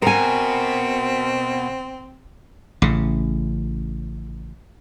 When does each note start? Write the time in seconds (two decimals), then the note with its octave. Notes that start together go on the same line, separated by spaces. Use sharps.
0.02 B2 C4 A#4 G#5
2.82 A1 C#3